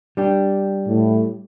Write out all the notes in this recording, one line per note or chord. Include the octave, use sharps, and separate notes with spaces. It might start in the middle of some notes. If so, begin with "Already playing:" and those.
G3 D4 G4
A2